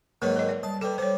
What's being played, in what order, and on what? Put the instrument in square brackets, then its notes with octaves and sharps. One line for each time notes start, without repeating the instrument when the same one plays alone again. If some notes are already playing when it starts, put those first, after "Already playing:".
[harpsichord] G#2 D#3 F#3 [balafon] A#3 B4 C#5
[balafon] A#4 D#5
D5
[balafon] G3 [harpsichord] A5
[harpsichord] G3 [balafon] A4 B4
[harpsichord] G3 [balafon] C5 C#5